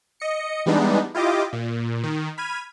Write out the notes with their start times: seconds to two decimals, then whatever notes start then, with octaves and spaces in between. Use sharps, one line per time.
0.20 D#5 C#7
0.66 E3 G3 G#3 B3 D4 D#4
1.15 E4 F4 G4 D#5 D6
1.53 A#2
2.03 D#3
2.38 B5 F6 G#6 D#7